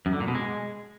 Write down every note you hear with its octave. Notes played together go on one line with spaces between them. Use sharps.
F#2
D3
A#2
B2
G#3